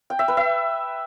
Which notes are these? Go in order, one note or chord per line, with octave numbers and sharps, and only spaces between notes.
G5
E5
B4
E5